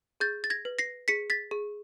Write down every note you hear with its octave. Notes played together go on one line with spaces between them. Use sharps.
G#4 G6 A6
A6
G#6 A#6
B4
A#6 C7
G#4 B6 C#7
A6 B6
G#4